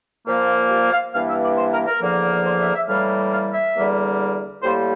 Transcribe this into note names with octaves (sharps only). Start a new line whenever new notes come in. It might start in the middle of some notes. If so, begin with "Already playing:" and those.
A#2 F3 A#3
G4
F5
G2 E3 A#3 F5
E5
D5
C5
A#4
A#4
E2 D3 F3 A#3
C5
E5
E5
A2 E3 G3 A#3 F5
F5
E5
E2 D3 G3 A#3
A2 G3 A#3 C5